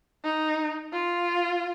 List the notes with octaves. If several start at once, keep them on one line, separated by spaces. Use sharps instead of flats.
D#4
F4